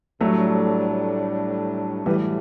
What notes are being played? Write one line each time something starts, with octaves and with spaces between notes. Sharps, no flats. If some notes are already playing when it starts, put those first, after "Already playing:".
A2 F#3 G3 A3 D4
A2 E3 F#3 G3 A3 E4